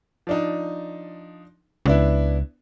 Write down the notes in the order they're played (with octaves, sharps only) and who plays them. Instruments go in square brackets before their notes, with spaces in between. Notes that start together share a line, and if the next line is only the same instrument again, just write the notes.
[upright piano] F3 D4 D#4
[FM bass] C#2 [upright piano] B3 D4 E4